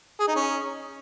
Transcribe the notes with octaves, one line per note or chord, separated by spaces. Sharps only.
G#4
D#4
C#4